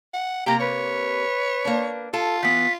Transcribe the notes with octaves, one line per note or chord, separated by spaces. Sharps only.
F#5
C3 A#3 G4 A#5
B4 C#5
A#3 D4
F4 A4
E3 B3 B6